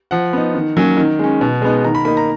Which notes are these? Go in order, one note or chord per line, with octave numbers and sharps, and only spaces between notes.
F3 F#5
B3 D#4
D#3
F#3 A#3 C#4
D#3
G#3 C#4
B2
G#3 B3 D#4
D#3 A#5
B5
A#3 D#4 B5
A#5